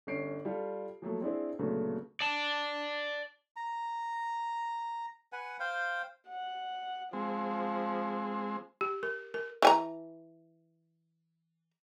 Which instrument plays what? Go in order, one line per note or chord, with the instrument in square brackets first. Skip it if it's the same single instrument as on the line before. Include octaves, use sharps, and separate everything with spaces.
[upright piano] G1 C#4 C7 D7
G3 F4 A4
F3 F#3 A3 A#3
C4 D4 E4 G#4 C5
D2 A#2 C#3 F#3 A3 B3
[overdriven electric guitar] D5 A5
[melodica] A#5
B4 F#5 G#5
C5 F5 G5
[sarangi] F#5
[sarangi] F3 [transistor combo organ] G#3 C4
[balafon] G4
A#4
A#4
[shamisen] E3 G#5 A#5